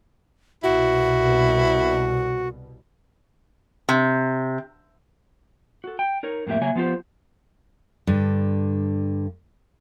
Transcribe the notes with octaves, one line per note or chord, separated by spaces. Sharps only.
C2 B2 E4 F#4
C3
F#4 A4
G5
D#4 A#4 C#5
F2 A2 A#3 G4 E5
C#3 F#3 A#3 C#5 E5 G#5
F3 B3 F4 G4 C5
G2 D3